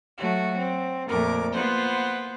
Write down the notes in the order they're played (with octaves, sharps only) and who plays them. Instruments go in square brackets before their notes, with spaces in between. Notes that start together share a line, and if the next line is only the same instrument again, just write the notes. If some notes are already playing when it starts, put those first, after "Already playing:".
[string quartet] F#3 A3 F#4
C4
F2 A#2 A3 A#4 D6
A#3 B3 F4 B4 C5 F#5